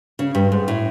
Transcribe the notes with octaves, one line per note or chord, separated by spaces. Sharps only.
C#3
G2
G#2
A2